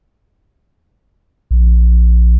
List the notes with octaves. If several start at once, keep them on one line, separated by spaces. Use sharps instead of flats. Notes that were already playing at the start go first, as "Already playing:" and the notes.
A#1